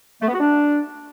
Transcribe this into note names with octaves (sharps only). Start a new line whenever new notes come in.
A3
B3
F#4
D4